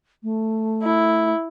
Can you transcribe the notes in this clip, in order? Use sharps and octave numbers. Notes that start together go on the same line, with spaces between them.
A3
E4